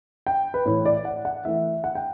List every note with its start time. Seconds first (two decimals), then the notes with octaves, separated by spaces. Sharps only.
0.27 G5
0.54 B4
0.66 A2 E3 A3 E4 C#5
0.85 D5
1.05 F#5
1.25 F#5
1.45 E3 A3 E4 E5
1.84 F#5
1.95 G5